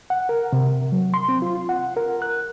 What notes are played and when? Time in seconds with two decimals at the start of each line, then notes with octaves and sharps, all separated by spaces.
0.10 F#5
0.29 A#4
0.53 C3
0.92 F#3
1.14 C6
1.29 C4
1.42 F4
1.69 F#5
1.97 A#4
2.22 F#6